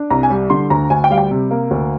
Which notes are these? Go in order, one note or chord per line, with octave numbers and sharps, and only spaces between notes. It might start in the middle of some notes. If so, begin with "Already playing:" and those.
Already playing: D4
C2 A#5
G#5
G3
D3 C6
D2 A#5
D2 G#5
G5
G3 F5
G5
C3
A#3
D2